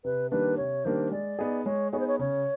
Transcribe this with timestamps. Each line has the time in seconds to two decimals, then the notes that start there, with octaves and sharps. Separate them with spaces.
0.04 C3 B4
0.31 D#3 G3 A#3 D4 B4
0.57 C3 C#5
0.85 D#3 G3 A#3 D4 C5
1.11 G#3 D5
1.39 B3 D#4 G#4
1.65 G#3 C#5
1.92 B3 D#4 G#4 C#5
2.00 C5
2.08 C#5
2.19 C#3 C#5